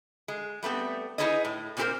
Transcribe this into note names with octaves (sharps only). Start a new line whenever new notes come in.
G#3
G3 A3 B3 C4
D#4 E4 G#4 B4 C#5 D#5
A2
A#2 A#3 C4 G4 A#4 C5